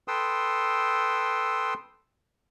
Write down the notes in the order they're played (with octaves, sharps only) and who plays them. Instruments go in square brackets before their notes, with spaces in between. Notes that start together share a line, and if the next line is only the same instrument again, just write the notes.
[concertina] A4 B4 G5 C6 D#6 E6